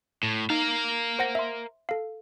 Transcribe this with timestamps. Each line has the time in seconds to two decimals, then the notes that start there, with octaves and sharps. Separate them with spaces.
0.23 A2
0.50 D#4 A#4 F5
1.19 C5 F#5 A#6
1.35 E5 C6
1.89 A4 F5